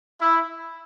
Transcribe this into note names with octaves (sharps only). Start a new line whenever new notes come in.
E4